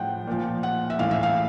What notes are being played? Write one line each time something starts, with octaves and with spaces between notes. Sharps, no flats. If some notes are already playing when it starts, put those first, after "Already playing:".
Already playing: A2 F3 F#5 G5
A#2 F3
F#5
E5
A2 E3 F5
E5
F5